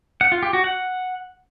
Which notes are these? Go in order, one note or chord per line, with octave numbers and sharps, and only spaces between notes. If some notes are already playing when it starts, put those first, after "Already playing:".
F#5
F4
G4
F#4
F#5